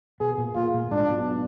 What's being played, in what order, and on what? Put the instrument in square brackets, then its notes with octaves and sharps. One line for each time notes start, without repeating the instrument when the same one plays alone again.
[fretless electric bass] B2 B3 [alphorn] G#4
[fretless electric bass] A#2 A#3
[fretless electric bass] A#2 A#3 [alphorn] F4
[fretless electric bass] A#2 A#3
A#3
[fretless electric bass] G#2 G#3 [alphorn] D4
[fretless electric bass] B1 B2